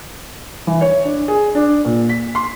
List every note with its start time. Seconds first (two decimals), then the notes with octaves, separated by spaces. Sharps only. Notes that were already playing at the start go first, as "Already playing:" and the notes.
0.67 E3
0.81 C#5
1.05 D4
1.28 G#4
1.55 D4
1.85 A#2
2.09 B6
2.35 C6